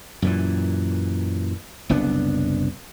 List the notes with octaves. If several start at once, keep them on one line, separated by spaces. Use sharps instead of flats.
F#2 A#2 E3
F#1 C2 B3 D4